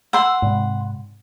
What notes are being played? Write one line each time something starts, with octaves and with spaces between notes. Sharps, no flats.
F#5 C6 E6
G#2 C3